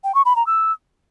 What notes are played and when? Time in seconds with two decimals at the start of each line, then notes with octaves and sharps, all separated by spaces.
0.04 G5
0.15 C#6
0.25 B5
0.36 A#5
0.47 E6